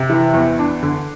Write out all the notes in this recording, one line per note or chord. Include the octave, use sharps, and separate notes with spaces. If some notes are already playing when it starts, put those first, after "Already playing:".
Already playing: C3
E3
E2
D4
D3